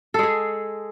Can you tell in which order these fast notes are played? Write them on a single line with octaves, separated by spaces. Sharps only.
A4 G#3 G#4